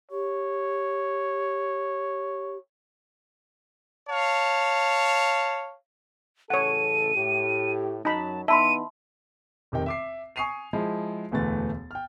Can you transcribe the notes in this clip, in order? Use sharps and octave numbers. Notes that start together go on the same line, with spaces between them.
G4 C#5
C#5 F5 A5
A1 C#3 A4 C#5 F#5 D#7
A2 G4
F#2 F#3 D#4 A5 B5
E3 B3 D#4 E5 A5 B5 C6 D#7
F1 C3 D#3 G5
E5 D6 C7
G#5 C#6 D#6 C7 D#7 F7
F3 G#3 E4
E1 D2 E3 A3 A6
G5 F6